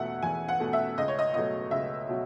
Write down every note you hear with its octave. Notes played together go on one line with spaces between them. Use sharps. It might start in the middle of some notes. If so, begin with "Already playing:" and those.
Already playing: E2 B2 A3 E5 F#5
E2 G#5
F#5
B2 A3
E5
C#2 D#5
C#5
D#5
B2 F#3 A3 D#5
C#2 E5
B2 F#3